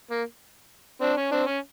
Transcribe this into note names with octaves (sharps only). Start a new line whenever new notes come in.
A#3
C4 D4
C#4
C4 D4
C#4